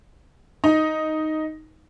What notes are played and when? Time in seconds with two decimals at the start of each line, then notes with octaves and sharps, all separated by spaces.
0.64 D#4